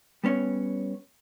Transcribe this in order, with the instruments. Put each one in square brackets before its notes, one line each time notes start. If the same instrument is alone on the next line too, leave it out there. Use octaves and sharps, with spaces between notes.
[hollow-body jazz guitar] G3 B3 C#4 C#5